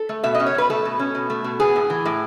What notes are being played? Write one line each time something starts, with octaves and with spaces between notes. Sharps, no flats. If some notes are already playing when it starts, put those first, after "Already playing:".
Already playing: A4
A3
B2 E5
D#5
C#4
C#5
B2 B4
A3 A4
B2
C#4
B2
A3
B2
B3 G#4
A2
E3
A2